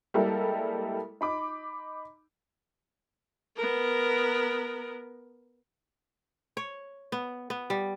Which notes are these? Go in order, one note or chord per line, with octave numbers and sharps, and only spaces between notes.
G3 G#3 A#3 E4 A4 A#4
D#4 B5 D6
B3 A#4
C#5
B3
B3
G3